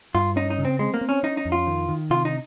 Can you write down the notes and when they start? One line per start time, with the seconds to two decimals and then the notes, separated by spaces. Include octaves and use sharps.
0.15 G2 F4
0.36 C#4 D#4
0.50 D#4
0.58 C#3
0.65 C4
0.79 G#3 C4
0.94 A#3
1.01 C4
1.09 C#4
1.23 C#4 D#4
1.37 D#4
1.45 F2
1.52 F4
1.67 D#3
1.88 D#3
2.10 C3 F4
2.25 D#4